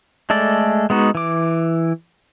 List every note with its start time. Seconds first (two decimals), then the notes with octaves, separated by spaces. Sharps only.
0.30 G#3 A3 A4 D5
0.90 G#3 B3 D#4 F#4
1.15 E3 D6